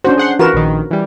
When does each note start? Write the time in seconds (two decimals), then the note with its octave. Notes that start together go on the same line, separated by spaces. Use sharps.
0.05 C#4 D4 F#4 C5
0.18 G#4 F#5 C6
0.39 E3 F4 F#4 A#4 B4 E7
0.54 A#1 D#3
0.91 E3 G3